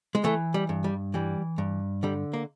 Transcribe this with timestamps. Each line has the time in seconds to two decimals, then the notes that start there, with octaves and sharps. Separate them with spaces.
0.15 G#3
0.24 E3 A3
0.54 G3
0.69 G2
0.84 G3
1.14 E3 G3
1.58 G2
2.03 D3 G3
2.34 A#3